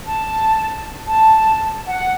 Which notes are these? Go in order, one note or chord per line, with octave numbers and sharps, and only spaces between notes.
A5
A5
F#5